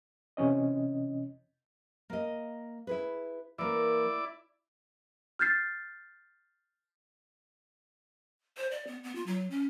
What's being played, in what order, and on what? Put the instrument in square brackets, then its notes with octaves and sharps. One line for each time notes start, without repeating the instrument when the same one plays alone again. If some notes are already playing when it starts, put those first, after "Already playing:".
[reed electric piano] C3 E3 C#4 D#5
[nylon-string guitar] A#3 D#5
E4 G#4 B4
[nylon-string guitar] E3 A#3 A#4 [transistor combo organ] E4 D5
[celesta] F6 G6 A6 C7
[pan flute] C5
D5
B3
B3
F4
F#3
C#4